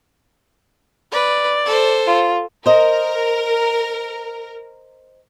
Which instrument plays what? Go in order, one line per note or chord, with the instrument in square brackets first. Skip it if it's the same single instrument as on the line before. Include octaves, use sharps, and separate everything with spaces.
[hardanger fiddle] B4 [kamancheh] D5
[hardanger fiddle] A4 C5
[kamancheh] F4
[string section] A#4 [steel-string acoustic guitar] C5 D#5